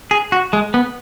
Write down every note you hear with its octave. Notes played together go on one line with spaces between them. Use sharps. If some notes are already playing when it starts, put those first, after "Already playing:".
G#4
F#4
G#3
B3